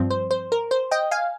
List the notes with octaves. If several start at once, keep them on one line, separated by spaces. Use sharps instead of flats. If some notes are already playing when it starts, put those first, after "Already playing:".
Already playing: G2 F3 C4
C5
C5
A#4
C5
D#5 G5
F5 G#5